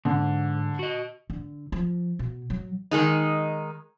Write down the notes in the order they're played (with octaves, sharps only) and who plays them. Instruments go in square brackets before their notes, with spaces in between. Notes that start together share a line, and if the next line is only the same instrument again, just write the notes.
[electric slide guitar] G#2 [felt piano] D3
[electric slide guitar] F#4 D#5
[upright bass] D3
F3
B2
F#3
[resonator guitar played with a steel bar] D#3 G#3 D#4